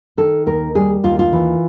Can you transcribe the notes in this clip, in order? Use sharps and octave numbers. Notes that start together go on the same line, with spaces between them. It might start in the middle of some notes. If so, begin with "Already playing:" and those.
D#3 A4
D#2 A#4
G3 G#4
D#2 F4
F4
E3